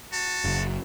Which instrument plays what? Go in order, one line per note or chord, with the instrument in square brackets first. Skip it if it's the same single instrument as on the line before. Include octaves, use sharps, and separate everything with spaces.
[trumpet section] F#4 A5
[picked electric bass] F#1